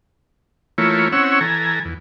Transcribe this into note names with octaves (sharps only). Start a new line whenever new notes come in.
E3 A3 A#3 E4 F4 C#5
C4 C#4 E4 C#5 F#5 E6
E3 A4 G#5 A#5
E2